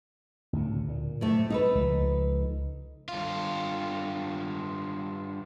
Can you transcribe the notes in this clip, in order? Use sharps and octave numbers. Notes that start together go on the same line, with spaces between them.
D2 A2 C#3
A#2
A2 C3 A3
G#3 A3 D#4 A4 B4
C#2 F3
G2 F4